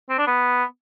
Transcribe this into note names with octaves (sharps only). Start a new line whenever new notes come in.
C4
D4
B3